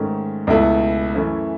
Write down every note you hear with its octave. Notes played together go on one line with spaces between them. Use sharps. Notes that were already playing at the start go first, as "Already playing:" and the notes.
Already playing: G#2 D#3 A3 C#4
C#2 B2 A3 E4 A4
F#2 E3 A3 C#4 E4